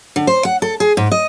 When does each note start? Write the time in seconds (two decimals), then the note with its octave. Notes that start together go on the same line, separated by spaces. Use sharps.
0.16 D3
0.27 C5
0.45 F#5
0.62 A4
0.80 G#4
0.97 G#2
1.12 D#5